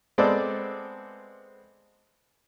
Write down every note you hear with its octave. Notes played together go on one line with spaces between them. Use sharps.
G#3 B3 C4 A4 D5